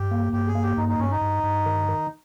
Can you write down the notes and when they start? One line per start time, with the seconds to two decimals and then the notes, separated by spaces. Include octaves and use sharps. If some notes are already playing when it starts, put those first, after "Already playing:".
Already playing: G2 G4
0.11 A#3
0.33 G2 G4
0.48 G#4
0.55 A#3
0.63 G4
0.77 G2 D#4
0.88 D#4
0.99 G2 C#4
1.11 D#4
1.21 G2
1.43 G2
1.66 D#3
1.89 D#3